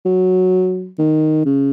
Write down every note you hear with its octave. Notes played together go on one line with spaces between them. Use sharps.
F#3
D#3
C#3